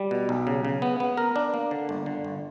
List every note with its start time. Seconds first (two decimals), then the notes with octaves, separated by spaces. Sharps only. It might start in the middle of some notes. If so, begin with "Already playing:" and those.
Already playing: G3
0.11 B2
0.29 B1
0.47 C#3
0.65 C#3
0.82 B3
1.00 B3
1.18 A#4
1.36 D4
1.54 A#3
1.71 D3
1.89 G1
2.06 D3
2.25 G1